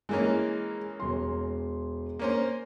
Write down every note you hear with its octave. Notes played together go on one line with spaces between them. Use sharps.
E3 G#3 A#3 C#4
E1 C6
A#3 C#4 C5